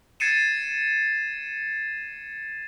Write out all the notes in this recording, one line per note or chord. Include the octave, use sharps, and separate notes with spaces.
G#6 A6 C7 C#7 D#7 E7